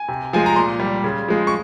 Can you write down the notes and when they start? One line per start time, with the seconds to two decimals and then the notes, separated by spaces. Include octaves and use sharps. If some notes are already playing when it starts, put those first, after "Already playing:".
Already playing: G#5
0.08 C3
0.33 F3 G#3 G#5
0.46 A#5
0.56 A#2 C6
0.80 G3
1.04 C#3
1.28 F3 G#3
1.47 C#6